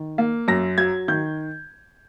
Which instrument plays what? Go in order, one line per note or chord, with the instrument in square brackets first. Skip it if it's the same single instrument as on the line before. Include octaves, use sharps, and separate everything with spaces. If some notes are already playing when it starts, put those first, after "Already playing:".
Already playing: [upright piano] D#3
A#3
F#2 A#6
F#3 G#6
D#3 G6